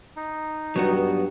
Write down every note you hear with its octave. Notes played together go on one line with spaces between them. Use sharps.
D#4
G2 F#3 B3 F#4